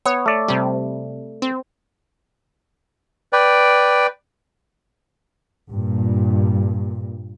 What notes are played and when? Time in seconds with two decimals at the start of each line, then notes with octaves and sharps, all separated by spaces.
0.06 B3 C#5
0.26 A3 D5
0.48 C3 G3
1.42 C4
3.33 B4 D5 G5
5.70 G2 A#2